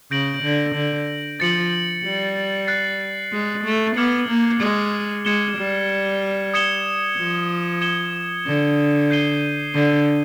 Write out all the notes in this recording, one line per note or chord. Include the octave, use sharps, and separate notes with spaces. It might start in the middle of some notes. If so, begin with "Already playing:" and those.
C#3 G6 A#6 D7 F#7
D3
D3
F3 A6 C#7 F#7
G3
F#6 A6 C7
G#3
A3
B3 D6 F6 G#6 C#7 F#7
A#3
G#3
G#3 G#6 C#7 E7 G7
G3
D#6 G#6 C#7 E7 G7
F3
G#6 C#7 E7 G7
D3
G6 C7 D#7 G7
D3